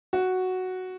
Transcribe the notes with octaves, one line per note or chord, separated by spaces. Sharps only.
F#4